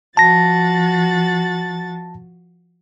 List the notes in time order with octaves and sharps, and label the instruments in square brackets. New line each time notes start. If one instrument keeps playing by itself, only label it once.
[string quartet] F3 F#4 A6 [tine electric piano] A5 A#6